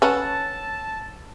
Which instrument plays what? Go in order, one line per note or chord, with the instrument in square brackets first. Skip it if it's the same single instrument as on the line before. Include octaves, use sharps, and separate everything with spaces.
[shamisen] C#4 B4 [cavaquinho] A4 F#5 [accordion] A5